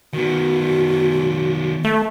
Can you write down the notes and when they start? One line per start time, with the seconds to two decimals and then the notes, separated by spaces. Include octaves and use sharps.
0.13 D#3 B3 F#4
1.84 A3 E5